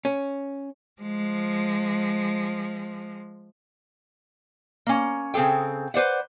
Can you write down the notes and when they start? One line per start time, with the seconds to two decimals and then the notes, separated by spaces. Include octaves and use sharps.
0.05 C#4
1.02 F3 G#3
4.87 A#3 C#4
5.34 C#3 C4 G#4 A4 G5
5.94 B4 C5 D5 F#5